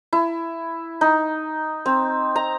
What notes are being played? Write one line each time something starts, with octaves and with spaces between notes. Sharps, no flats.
E4
D#4
C4
A#5